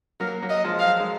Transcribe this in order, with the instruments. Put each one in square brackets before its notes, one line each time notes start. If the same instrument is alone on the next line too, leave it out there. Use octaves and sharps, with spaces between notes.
[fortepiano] F#3 A#3 [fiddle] A#4
[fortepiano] F#3 A#3
[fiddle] D#5
[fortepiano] F3 G#3
[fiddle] F5
[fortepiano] F#3
G#3